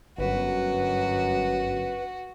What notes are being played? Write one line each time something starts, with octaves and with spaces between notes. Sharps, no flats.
G1 F#2 F#4 B4